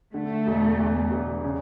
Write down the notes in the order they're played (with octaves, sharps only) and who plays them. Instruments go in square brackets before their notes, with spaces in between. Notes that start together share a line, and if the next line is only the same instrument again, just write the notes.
[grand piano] D3 [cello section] A3
[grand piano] E1
E2
E1
C#3